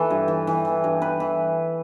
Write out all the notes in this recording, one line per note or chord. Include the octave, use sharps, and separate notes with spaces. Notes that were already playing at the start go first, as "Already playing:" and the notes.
Already playing: E3 A4 B4
G2
E3
E3
E3
G2
E3 B4
E3